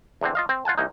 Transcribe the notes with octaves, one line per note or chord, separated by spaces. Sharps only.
E2 D3 C4
F4 D#5 F5
C4
F4 F#5 G#5 A5
C2 A#3 D#4